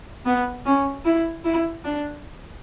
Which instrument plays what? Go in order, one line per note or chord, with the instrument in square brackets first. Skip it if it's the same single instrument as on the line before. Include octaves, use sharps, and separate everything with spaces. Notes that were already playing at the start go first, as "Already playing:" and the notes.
[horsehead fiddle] B3
C#4
E4
E4
D4